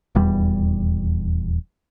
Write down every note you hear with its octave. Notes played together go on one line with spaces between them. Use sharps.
D#1 E2 G3